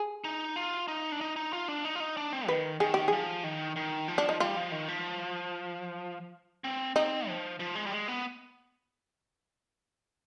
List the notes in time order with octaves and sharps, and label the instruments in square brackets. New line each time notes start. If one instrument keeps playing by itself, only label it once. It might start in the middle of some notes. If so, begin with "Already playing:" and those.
Already playing: [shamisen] G#4
[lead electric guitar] D#4
F4
D#4
D4
D#4
D#4
F4
D4
D#4
F4
D#4
D4
C4
[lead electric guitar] D#3 [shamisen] B4
[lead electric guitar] D#3 [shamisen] G#4
[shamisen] G4
[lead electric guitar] F3 [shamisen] G#4
[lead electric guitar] D#3
D#3
F3
[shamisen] D4
D#4
[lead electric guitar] G3 [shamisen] F4
[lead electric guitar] F3
D#3
F3
C4
[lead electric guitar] C4 [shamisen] D#4
[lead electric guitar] F3
F3
G#3
G3
G#3
B3